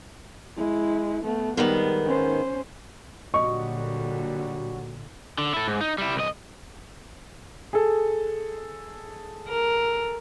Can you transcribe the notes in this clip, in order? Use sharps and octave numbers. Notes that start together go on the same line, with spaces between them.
G#3 E4
A3 B3
G#2 D#3 G3 B3
C#4 C5
A#2 D3 F#3 G3 F#4 D#5 C#6
D3
E4 A4
G#2
D#4
G3 E4
C2 D#5
G#4 A4
A#4